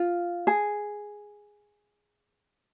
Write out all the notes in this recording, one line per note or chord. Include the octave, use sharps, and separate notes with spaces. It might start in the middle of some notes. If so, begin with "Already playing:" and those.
Already playing: F4
G#4